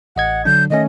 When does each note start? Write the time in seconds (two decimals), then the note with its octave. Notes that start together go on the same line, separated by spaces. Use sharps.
0.16 A1 D#5 F#5 G#6
0.45 D3 F#3 D4 G6
0.70 D#3 A3 C#4 D#5